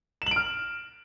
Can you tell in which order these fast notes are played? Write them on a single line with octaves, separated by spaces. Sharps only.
E7 F#7 D7 F6